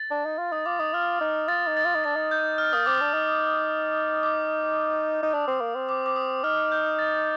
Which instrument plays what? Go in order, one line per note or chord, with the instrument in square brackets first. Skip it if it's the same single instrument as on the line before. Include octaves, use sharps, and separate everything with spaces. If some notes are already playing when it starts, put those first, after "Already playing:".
Already playing: [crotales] A6
[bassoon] D4
D#4
F4
[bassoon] D#4 [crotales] D#6
[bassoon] F4 [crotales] D6
[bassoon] D#4 [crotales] D#6
[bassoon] F4 [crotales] F6
[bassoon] D#4
[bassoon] F4 [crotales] A6
[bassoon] D#4
[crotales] A6
[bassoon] F4
D#4
[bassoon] D4 [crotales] A6
[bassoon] D#4
[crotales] G6
F6
[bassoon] A#3 [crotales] D#6
[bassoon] C4 [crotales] D6
[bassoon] D4
D#4
[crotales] D6
[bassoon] D#4
[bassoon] D4 [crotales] D#6
[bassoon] C4
A#3
C4
[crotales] D6
D6
D#6
[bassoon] D#4 [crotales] F6
[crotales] G6
A6